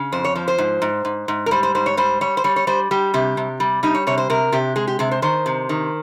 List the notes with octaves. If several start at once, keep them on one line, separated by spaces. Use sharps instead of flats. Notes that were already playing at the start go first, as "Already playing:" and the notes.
Already playing: C#3
F2 C5
C#5
F3 C5
C5
G#2
G#2
G#2
G#2
A#4
G3 C5
C5
G#2 C5
C#5
G3 C5
G3 C#5
C5
G3 C#5
C#5
G3 C5
G3 G4
C3 G4
C3
G3
G3 D#4
C#5
C3 C#5
C5
C3 A#4
C3 G4
G#3 G#4
G4
C3 G#4
C5
D#3 C5
C3
D#3